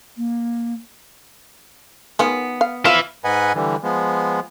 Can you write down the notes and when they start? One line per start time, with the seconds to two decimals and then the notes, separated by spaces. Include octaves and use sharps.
0.17 A#3
2.19 D#3 B3 F4 G#4
2.61 F5
2.85 F3 F4 B4 E5 F5
3.24 G#2 B4 D#5 F#5 G#5
3.55 D3 E3 G3
3.83 F3 G#3 B3